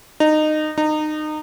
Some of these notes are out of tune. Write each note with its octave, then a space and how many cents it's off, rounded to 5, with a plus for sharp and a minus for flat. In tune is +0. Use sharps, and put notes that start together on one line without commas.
D#4 -20
D#4 -25